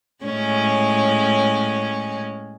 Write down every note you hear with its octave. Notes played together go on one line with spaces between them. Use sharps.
A2 G#3 C#4